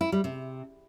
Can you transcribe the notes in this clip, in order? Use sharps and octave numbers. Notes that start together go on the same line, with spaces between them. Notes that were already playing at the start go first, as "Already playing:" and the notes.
E4
G3
C3